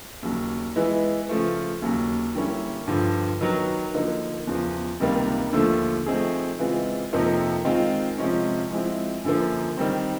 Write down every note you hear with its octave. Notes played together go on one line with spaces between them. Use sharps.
D#2 C#3 F#3
E3 G#3 B3 E4
C#3 F3 A3
D#2 C#3 F#3
D3 G3 A#3 C#4 E4
G2 D3 F3
D#3 F#3 B3
D3 F3 A#3 D#4
E2 C#3 F3
C#2 C3 D#3 G3 A#3
D#2 D3 F3 A3
F3 A3 C4 D#4 G#4
C#3 E3 G#3 C4 F4
F2 C3 F3 A#3 D#4
D#3 G#3 C4 F4
C3 F3 G#3 C#4
F3 G#3 C4 E4
F#2 D3 F3 A#3
D#3 G3 C4